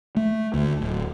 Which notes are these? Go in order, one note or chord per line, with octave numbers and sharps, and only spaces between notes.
A3
D2
D1